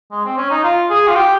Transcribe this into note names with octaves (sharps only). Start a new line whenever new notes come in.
G#3
C4
C#4
D#4
F4
G#4
F4
G4